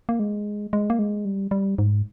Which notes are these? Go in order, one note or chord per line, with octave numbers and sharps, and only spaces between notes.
A#3
G#3
G#3
A#3
G#3
G3
G3
G#2